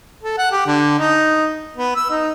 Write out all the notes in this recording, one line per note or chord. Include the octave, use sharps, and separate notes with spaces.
A4
F#5
G4
D3
D#4
B3
E6
D#4